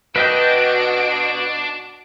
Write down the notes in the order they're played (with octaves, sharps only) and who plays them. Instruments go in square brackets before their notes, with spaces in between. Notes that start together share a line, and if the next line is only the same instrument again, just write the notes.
[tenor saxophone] B2 [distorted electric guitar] D4 [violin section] F#4 D7 [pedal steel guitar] B4 D#5 G5